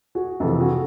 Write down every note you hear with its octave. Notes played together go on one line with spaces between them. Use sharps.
F#4 G#4
F2 C3 E3 G4 A4
F#4 G#4